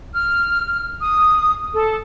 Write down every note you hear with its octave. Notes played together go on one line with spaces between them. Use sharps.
F6
D#6
A4